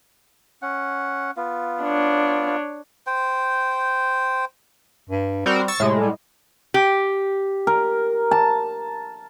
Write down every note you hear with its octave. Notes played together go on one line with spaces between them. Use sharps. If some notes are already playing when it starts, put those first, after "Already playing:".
C#4 F#5
B3 F4
D4 C#5
C5 G5
G2
G3 C4 F#4 A#4
C#6 E6 A6
A2 C3 G#3
G3
G4
A#4
A5